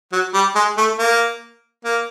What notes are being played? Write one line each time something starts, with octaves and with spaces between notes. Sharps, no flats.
F#3
G3
G#3
A3
A#3
A#3